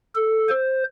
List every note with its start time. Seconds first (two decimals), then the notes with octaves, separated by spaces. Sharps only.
0.15 A4
0.48 C5